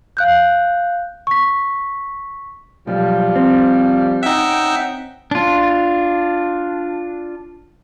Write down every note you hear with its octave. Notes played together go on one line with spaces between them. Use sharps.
F5 F#6 G6
C#6 B6
B1 F3 G3
C4
C#4 D#4 E5 F#5 G5
D4 F4